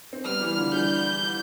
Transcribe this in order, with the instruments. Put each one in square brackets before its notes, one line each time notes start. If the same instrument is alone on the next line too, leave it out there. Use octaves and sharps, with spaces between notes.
[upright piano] C4
[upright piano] G3 B3 [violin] F6
[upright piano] E3 G3
D3 F3
[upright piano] E3 G3 [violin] G6